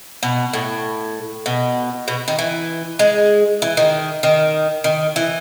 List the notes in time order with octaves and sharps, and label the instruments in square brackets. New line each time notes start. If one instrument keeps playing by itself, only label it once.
[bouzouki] B2
A2
B2
B2
D#3
E3
G#3
E3
D#3
D#3
D#3
E3